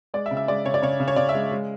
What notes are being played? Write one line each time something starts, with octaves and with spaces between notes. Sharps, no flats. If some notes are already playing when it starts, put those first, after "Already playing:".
G#3 D5
E5
C#3
E5
G#3 D5
C#3 C#5
D5
C#3 C#5
C#3
C#5
C#3 D5
E5
G#3
G#3